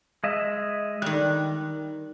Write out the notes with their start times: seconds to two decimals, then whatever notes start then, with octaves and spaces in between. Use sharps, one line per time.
0.24 G#3 D#5 E5
1.02 D#3 G3 F#6